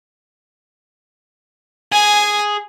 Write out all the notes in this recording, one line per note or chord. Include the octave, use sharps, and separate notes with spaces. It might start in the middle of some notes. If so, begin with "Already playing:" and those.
G#4 G#5